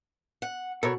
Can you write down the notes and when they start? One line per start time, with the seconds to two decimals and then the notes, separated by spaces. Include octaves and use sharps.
0.42 F#5
0.83 B2 A4 A#4 C#5